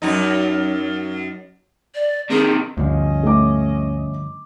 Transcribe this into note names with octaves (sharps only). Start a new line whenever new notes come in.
F#2 D#4
D5
C3 D#3 G#4
D2 G2 D3 F3 C#4 D#5
A3 D6